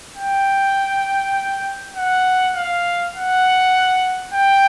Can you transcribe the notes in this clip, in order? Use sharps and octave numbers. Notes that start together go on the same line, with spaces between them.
G5
F#5
F5
F#5
G5